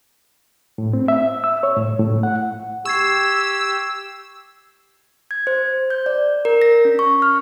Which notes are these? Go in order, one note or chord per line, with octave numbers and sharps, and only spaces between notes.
A2
C4
E5
E6
C#5
A2
A2
F#5
G4 C#6 E6 G#6 C7
G#6
C5
G6
D5
A#4
A#6
C#4
C#6
F6